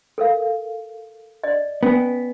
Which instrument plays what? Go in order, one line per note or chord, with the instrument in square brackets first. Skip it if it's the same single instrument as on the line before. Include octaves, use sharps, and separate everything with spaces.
[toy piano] A4 A#4 F5
D5 D#5
[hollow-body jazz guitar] B3 [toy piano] C#4 G#5